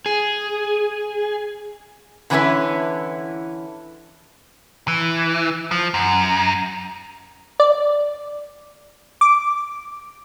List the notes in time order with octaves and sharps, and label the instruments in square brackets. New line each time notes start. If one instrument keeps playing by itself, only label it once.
[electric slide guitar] G#4
[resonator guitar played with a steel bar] D3 E3 A#3 C#4 E4 B4
[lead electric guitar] E3
F3
F#2
[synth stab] D5
D6